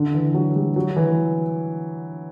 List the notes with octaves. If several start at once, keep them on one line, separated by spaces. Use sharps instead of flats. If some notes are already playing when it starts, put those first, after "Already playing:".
Already playing: D3
E3
F#3
G3
F#3
E3